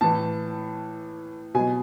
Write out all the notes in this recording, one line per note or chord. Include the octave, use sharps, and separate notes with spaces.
A2 E3 A5
B2 F#3 G#5